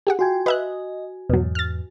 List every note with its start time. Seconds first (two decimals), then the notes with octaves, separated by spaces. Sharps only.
0.07 G4 G#4 F#5
0.19 F4 F#4 G5 G#5 G#6
0.46 B4 D#5 E5 F#6
1.30 E2 G#2 B2 F#3
1.55 F6 A6